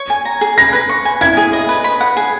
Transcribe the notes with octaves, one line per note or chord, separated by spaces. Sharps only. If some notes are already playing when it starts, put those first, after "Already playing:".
Already playing: C#5
G#5
A#5
G#4
B4 A#6
B4
C#6
G#5
E4 G#6
G#4
D#5
B4
B5
F#5
G#4